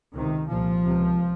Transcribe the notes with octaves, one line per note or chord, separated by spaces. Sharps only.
C#2 C3 D#3
C2 A#2 F3
C#2 C3